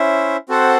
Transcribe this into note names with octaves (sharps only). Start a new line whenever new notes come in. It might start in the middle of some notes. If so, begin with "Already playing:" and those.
Already playing: C#4 E4 C5 E5
C4 F#4 A4 C5 F#5